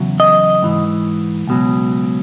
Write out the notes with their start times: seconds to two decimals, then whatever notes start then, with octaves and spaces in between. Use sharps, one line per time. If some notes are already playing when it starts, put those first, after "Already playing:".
Already playing: E2 C#3 F#3
0.20 D#5
0.62 G#2 E3
1.47 C#2 B2 F#3